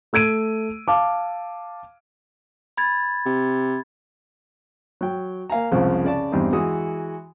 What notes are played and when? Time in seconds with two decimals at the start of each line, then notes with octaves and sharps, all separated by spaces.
0.13 A3 E6 G#6 D7 D#7
0.88 F5 A5 D6
2.77 B5 G#6 A6
3.26 C3
5.01 F#3 G5
5.50 A#3 F5 G#5 A#5
5.71 C2 F2 C#3 F3 G#3 C4
6.04 C#3 D5 A5
6.32 E2 G2 G3 C4 D#4
6.52 E3 G#3 F#4 D#6